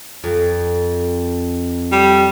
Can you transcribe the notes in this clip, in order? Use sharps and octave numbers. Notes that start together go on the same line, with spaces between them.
F2
G3